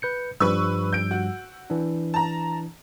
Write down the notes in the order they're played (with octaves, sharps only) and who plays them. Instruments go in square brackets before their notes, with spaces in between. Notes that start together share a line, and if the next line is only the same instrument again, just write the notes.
[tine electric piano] B4 G6 C#7
[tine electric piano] G2 F3 G3 [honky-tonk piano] B4 C#6 E6
[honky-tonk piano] G6 D7
F#4
[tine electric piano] E3 D4
[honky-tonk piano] A5 A#5